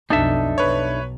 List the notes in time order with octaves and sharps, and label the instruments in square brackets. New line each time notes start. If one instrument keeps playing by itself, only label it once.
[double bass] B1 F2 [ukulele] D4 [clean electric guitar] D#4 A4 E5
[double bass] B1 [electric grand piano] B4 C#5